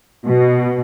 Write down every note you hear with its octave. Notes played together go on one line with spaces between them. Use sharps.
B2